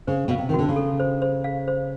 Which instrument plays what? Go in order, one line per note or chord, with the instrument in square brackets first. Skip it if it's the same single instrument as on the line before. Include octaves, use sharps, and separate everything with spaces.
[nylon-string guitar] C#3 [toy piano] C5
[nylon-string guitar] B2 [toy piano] F5
[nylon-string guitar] C3
D#3
[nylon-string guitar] D3 [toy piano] F#4
[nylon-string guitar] C#3
[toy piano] A4
C5
C5
F5
C5